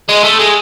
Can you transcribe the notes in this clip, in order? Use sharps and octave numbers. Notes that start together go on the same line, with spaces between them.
G#3
A3
G#3